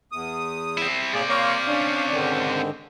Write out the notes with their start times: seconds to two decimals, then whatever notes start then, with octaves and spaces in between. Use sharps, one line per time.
0.12 E2 D#6
0.77 C4 E4
1.14 A2 A#3 C4 G#4 D5
1.29 A#3 F4 C#5 F5
1.68 C#4 D4
2.11 G#2 D3 D#3